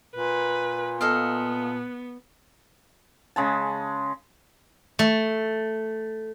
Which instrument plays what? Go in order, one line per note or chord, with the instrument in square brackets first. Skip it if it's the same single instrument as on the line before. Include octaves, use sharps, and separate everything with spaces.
[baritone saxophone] A#2 [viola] B4
[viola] B3 [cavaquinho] A4 D#5 F5
[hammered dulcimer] C#3 G#3 A5
[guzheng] A3